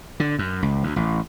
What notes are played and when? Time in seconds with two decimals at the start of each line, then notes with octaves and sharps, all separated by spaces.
0.20 D3
0.39 F#2
0.62 C#2
0.83 D2
0.96 A1